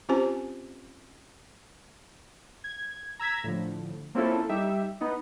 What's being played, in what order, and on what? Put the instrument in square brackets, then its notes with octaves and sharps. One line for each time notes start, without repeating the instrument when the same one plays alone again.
[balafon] C4 C#4 F4 G4 C5 G#5
[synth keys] G#6
A#5 E6 G#6 B6
A2 D3 F3
A#3 C4 C#4 E4 F4 A4
G3 D#4 G4 E5
B3 D#4